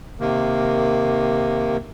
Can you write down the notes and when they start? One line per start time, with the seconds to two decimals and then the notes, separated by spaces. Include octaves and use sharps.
0.20 C3 D#3 A#3